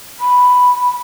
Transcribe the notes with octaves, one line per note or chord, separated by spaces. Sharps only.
B5